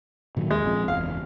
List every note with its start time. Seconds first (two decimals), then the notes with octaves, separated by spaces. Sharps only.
0.37 A#2 D#3 F#3
0.51 D#2 G#3
0.65 A#1 F3 C4
0.88 F#1 E2 F5